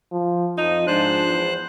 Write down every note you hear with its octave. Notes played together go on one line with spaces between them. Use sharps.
F3
F2 F3 D#4
G#2 F3 D4 C5 F#6
E2